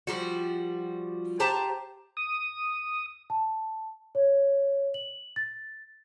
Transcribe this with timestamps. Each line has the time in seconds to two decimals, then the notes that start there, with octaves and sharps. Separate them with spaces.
0.07 F3 G3 F#4
1.40 G4 C5 A5 A#5
2.17 D#6
3.30 A5
4.15 C#5
4.94 F#7
5.36 A6